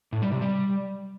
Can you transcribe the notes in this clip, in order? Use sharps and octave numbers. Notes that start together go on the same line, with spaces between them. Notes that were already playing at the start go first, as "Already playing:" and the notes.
A2
G3
C3
G3